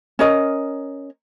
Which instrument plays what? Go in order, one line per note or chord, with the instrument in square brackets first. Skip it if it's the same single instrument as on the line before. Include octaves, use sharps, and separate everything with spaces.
[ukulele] C#4 A#4 D#5